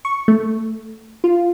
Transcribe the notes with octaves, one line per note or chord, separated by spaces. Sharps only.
C#6
A3
F4